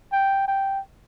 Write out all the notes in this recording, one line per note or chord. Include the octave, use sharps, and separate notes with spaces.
G5
G5